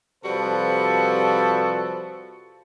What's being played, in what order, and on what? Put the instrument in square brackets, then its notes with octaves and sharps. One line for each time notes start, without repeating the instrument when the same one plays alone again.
[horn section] C3 F3 G3 F#4 A4 B4